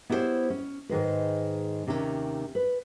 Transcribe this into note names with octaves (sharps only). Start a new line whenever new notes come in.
B3 E4 G4 G#4 C5 C#5
C#4
G#2 D#3 G#3 B4
D#2 C3 D#3 A3 C#4 C#5
B4